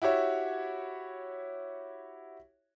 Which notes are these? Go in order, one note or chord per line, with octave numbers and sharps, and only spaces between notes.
E4 F#4 G4 C#5 E5